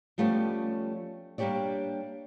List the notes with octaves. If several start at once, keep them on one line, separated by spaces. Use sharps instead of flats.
F3 G3 A3 B3 C#4 G4
G3 A#3 D4 G4 C#5 D5